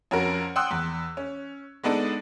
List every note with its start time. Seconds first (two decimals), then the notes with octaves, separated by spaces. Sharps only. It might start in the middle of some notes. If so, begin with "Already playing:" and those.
0.11 F2 C#4 F#4 A#4
0.56 F#5 G5 C6 D#6 E6 F#6
0.71 E2
1.17 C#4
1.84 G#3 B3 D4 D#4 A4